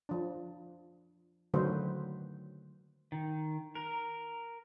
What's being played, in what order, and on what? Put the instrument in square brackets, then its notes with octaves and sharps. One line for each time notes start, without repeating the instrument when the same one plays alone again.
[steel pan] F3 D4
D3 D#3 F#3 A3 B4 C5
[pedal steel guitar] D#3
A#4